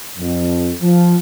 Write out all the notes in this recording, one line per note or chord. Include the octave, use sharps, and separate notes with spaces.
F2
F3